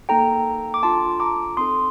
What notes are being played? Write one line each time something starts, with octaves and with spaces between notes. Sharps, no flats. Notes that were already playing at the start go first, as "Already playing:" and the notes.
A#3 D#4 A4 G5 A#5
D6
D4 F4 A4 A5 C6
A#5 D6
C4 D#4 A4 C6 D#6